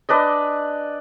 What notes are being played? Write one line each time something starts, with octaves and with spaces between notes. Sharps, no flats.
D4 B4 D5 D#5